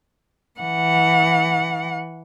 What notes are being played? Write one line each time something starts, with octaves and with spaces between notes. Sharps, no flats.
E3 F#5